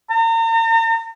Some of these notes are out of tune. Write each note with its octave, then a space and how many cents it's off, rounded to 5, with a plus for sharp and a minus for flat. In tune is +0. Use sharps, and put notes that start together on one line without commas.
A#5 -40